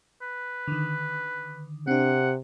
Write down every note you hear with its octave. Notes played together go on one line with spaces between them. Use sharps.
B4
D3 D#3
C3 C4 D4 F#5